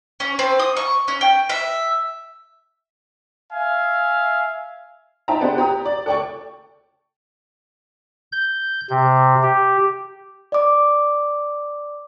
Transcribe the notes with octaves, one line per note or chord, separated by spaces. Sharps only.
C#4
C4
D#6
C#6
C#4
G5
E5
E5 F5 G#5
D#4 C5 E5 G5 A5 A#5
B3 D4 G4 G#4 C5
G4 A#5 D#6
D5
A4 D5 G5 C#6
G6
C3
G4
D5 D6